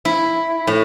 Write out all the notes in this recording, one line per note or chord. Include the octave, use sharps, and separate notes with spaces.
E4
A2